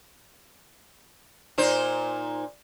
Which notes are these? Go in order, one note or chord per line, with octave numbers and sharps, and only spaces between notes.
A#2 D#4 C5